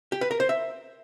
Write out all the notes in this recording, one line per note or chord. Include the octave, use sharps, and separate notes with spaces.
G4
B4
A#4
C5
E5